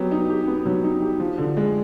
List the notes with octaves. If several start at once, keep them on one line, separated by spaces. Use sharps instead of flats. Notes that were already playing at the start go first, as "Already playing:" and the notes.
Already playing: F#3 B3 G4
D#4
G4
B3
F#3
D#4
G4
F3
D3
G#3